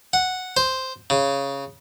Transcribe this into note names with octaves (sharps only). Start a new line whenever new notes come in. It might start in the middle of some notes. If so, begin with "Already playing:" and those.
F#5
C5
C#3